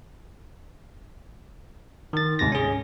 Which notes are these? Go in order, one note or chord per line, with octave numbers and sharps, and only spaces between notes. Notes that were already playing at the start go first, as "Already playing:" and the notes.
D#3 A6
D2 G#2 C3 A6 A#6
C#4 G#4